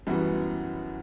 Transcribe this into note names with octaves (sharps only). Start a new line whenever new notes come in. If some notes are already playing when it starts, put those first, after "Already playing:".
F#2 E3 G3 B3 F#4